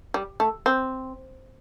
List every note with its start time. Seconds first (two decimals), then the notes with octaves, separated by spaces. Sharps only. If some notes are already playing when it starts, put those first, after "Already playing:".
0.14 G3
0.40 A3
0.66 C4